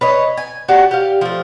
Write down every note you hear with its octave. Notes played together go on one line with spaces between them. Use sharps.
B4 C#5 D#5
G#5
D4 F#4 G4
G4 F5
F3 A3